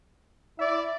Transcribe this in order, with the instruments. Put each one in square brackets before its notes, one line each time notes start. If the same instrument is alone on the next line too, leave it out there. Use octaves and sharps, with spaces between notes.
[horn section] E4 D5 [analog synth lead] E5